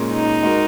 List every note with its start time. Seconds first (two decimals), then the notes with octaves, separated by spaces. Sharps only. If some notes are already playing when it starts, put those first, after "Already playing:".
Already playing: A#2 G#3 C#4 A#4
0.13 D#4
0.43 G#3 F#4 A#4